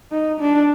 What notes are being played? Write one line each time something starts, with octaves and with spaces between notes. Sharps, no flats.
D#4
D4